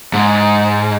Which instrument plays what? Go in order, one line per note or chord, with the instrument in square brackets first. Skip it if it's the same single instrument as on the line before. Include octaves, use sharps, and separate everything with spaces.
[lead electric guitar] G#2